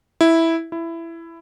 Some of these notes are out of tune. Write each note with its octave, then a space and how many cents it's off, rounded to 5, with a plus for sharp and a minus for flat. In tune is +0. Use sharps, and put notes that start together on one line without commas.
E4 -5
E4 +15